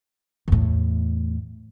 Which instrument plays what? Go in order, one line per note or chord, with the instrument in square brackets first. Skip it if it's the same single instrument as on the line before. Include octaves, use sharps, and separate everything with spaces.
[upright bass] E2 A2